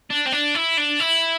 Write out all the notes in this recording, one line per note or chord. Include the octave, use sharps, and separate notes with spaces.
D4
C4
D4
E4
D4
E4